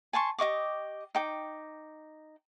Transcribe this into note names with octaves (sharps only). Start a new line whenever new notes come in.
G#5 A5 C6 C#6
G4 D#5 C#6 D6
D#4 G5 D6